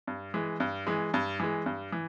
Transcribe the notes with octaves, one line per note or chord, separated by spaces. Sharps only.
G2
E3 G#3
G2
E3 G#3
G2
E3 G#3
G2
E3